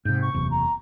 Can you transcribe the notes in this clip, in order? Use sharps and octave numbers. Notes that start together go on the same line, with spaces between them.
G#2 C3 G6
C#6
F#1 E2 C3
A#5